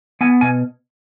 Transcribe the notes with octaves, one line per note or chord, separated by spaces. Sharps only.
B3 G#5
B2 G#5